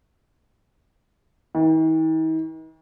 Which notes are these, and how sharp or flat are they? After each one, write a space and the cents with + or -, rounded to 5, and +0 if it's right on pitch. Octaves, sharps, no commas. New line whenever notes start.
D#3 +45